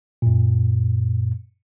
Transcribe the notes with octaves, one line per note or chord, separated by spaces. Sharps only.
F#2 A#2